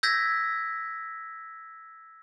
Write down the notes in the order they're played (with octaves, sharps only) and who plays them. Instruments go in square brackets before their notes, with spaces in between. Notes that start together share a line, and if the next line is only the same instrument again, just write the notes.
[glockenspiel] E6 G6 G#6 A#6 B6